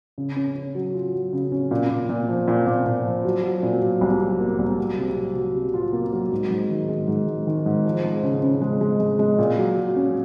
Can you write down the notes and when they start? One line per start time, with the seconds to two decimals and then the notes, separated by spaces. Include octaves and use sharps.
0.18 C#3
0.36 C#4
0.56 C#4
0.75 F#3
0.94 F4
1.14 F#3
1.33 C#3
1.52 C#4
1.71 A#2
1.90 A#2
2.09 A#2
2.28 F3
2.48 A#2
2.67 A#2
2.86 A#2
3.06 F3
3.25 F#3
3.43 F#3
3.63 A#2
3.82 F#3
4.01 C2
4.20 F#3
4.40 A#3
4.59 C2
4.78 F#3
4.97 C3
5.16 F#3
5.35 F#3
5.55 C3
5.74 F4
5.93 A#3
6.13 F#3
6.32 G#2
6.51 G#2
6.70 D#3
6.89 G#3
7.08 G#2
7.27 G#3
7.47 D#3
7.66 G#2
7.85 F3
8.04 G#3
8.23 C#3
8.43 C#3
8.62 G#3
8.81 G#3
9.00 G#3
9.19 G#3
9.39 A#2
9.58 F#3
9.77 F#3
9.96 C#4